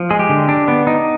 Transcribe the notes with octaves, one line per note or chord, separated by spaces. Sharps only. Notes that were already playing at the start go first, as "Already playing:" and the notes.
Already playing: F3
G#3 G#4
G4
D3
D4
B3
D#4